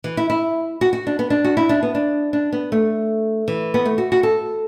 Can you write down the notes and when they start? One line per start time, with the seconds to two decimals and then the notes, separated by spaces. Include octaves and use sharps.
0.04 E3
0.17 E4
0.30 E4
0.81 F#4
0.93 F#4
1.07 D4
1.19 B3
1.30 D4
1.44 F#4
1.57 E4
1.69 D4
1.83 B3
1.95 D4
2.33 D4
2.53 B3
2.72 A3
3.48 E3
3.74 B3
3.85 A3
3.98 F#4
4.12 F#4
4.23 A4